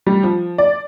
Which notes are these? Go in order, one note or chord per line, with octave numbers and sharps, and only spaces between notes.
G3
F3
D5